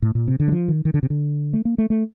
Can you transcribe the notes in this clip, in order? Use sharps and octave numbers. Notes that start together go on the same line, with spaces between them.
A2
A#2
C3
D3
G3
F3
D#3
D#3
D3
C3
D3
A3
A#3
A3
A3